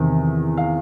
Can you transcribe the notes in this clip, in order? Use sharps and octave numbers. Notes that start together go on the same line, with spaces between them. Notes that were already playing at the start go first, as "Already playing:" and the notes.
Already playing: E2 C3 D#3
F5